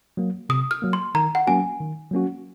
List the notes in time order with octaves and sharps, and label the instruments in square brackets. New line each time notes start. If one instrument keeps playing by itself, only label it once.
[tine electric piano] F#3 A#3
[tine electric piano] C3 [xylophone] D#6
[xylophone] F6
[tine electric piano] F#3 A#3
[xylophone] C6
[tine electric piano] D#3 [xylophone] A#5
[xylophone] F#5
[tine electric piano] F#3 A#3 C#4 F#4 [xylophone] G#5
[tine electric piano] D#3
F#3 A#3 C#4 F#4